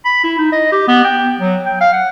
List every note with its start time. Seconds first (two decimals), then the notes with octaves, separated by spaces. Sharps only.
0.05 B5
0.24 E4
0.38 D#4
0.52 D#5
0.72 G4
0.88 B3
1.04 G5
1.40 F#3
1.66 G5
1.81 F5
1.93 F#5